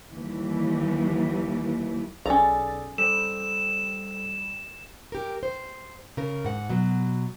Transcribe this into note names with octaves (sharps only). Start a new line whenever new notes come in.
D#2 E3 G3
B1 C#4 G#4 A4 D5 A#5 A6
G3 A4 C5 E7
G4 A#4
C5
C#3 A#4
G#2 F#5
B2 F#3